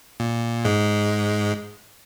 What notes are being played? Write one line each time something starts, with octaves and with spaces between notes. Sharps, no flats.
A#2
G#2 G#3